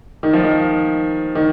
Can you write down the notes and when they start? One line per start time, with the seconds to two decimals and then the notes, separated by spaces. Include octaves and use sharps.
0.23 D#3
0.33 F3
0.44 D#3
1.35 D#3